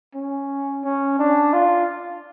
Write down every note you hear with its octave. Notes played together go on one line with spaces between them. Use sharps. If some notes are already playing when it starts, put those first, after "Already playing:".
C#4
C#4
D4
F4